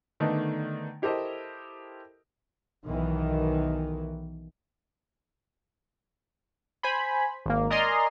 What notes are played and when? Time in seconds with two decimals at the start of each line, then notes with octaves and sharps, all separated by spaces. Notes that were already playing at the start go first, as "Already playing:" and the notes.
0.20 D3 D#3 A3 B3 D4 D#4
1.02 E4 G4 A4 A#4 C5 D#5
2.85 B1 D#3 E3
6.83 C5 G#5 B5
7.46 G#1 A#3
7.70 A#4 D5 D#5 G#5 A#5 C6